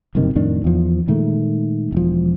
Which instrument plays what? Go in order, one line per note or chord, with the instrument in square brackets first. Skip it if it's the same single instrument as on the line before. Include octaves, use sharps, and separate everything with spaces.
[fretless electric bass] F#1 G2 C3 D#3
F2 A2 D#3 D4
E2 F3
A#2 D#3 G#3 A3
E1 F3